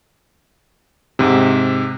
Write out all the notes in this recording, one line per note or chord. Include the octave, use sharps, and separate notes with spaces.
G#2 C3